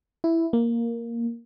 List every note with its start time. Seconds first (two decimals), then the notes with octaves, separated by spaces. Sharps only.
0.24 E4
0.53 A#3